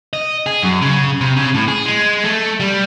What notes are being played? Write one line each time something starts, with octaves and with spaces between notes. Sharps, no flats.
D#5
G#4
F#2
C#3
C3
C#3
A2
G#4
G#3
A3
G3